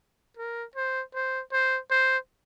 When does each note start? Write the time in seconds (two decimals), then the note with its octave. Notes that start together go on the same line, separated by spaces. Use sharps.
0.37 A#4
0.75 C5
1.14 C5
1.52 C5
1.91 C5